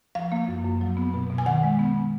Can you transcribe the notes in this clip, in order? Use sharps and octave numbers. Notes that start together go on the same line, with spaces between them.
F3 F5
A#3
F#2
F#2
F#3
B3
B2
B2
G#5
D#3 F#5
G#3
B3